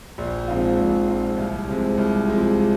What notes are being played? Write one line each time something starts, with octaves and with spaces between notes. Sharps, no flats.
A#1
G#2 F3 C4 F4
A#1
G#2 F3 C4 F4
C2
C3 F3 G#3
C2
C3 F3 G#3